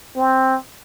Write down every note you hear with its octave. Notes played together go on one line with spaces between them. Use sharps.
C4